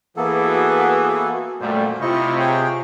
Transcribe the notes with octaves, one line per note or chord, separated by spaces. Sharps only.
E3 A#3 B3 G#4 A4
F#4
F#2 A#2 G3 A3 C5
C3 E4 F4 D#5 C#6
G#4 C#5 G5